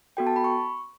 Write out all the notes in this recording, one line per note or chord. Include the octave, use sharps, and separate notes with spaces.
B3 F#4 A4 G5
A5
B5
C#6